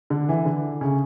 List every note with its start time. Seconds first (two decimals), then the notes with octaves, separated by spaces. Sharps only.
0.10 D3
0.29 E3
0.46 D3
0.81 C#3